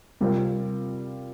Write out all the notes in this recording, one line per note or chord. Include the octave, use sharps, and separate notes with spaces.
C3 G3 C4 F4 A#4